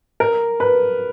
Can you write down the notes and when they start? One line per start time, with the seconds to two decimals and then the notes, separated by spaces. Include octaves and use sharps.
0.20 A#4
0.60 B4